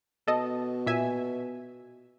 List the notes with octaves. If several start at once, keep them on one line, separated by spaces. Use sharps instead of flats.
B2 A4 D#5
A#2 E5 G#5